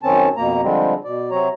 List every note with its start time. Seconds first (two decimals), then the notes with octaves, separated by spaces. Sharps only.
0.03 F#2 D#3 C4 C#4 A5
0.37 F2 B2 A#3 A#5
0.63 D3 F3 G3 G#3 C4
1.04 B2 D5
1.31 C3 F#3 C4 C#5 A#5